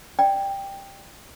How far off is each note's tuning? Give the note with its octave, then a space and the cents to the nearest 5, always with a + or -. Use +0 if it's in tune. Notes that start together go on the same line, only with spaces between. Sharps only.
D5 +15 G5 +10